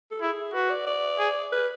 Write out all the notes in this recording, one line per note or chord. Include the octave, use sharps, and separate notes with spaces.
A4
E4 G#4
F#4 B4
D5
D5
G#4
B4